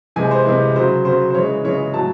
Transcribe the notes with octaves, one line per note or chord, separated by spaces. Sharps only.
C3 E3 G#3 G#5
C5
C3 E3 G#3
C#3 F#3 C5
C#3 F#3 C5
C5
C#3 E3 G#3 C#5
C#3 E3 G#3 C#5
A2 F#3 A5